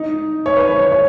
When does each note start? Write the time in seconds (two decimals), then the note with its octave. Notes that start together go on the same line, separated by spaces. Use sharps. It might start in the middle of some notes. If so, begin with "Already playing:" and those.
Already playing: D#4
0.46 C#5
0.57 B4
0.68 C#5
0.92 C#5